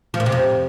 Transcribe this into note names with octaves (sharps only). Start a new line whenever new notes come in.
F3
A#2
C3
F2